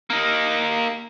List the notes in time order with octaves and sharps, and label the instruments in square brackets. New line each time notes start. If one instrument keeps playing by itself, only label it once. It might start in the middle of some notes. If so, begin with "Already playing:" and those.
[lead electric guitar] A#3 D#4